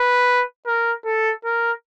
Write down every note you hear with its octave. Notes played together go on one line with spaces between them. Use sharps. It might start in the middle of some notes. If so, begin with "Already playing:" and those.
Already playing: B4
A#4
A4
A#4